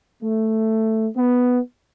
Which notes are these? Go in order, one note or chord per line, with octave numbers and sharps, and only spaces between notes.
A3
B3